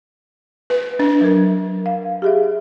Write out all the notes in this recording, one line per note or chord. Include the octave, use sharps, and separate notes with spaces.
B4
D4 A6
F#3 A#4
F5
G4 G#4 E5